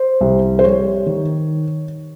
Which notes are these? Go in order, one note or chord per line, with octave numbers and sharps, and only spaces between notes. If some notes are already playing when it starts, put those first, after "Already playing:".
Already playing: C5
C2
C5
G3 C#5
D#3